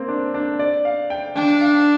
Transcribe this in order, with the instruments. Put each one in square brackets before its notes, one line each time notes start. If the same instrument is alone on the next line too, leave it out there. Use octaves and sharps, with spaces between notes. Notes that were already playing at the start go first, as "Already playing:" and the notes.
Already playing: [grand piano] A#3 C4
D4
D4
D5
F5
G5
[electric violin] D4 [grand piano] G5
[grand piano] F5